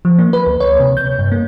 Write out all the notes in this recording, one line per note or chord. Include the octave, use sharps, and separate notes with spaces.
F3
A#3
B4
D2
C#5
C3
G6
G2
A#3